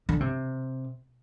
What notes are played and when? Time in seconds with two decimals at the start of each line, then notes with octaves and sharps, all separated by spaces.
0.09 D3
0.20 C3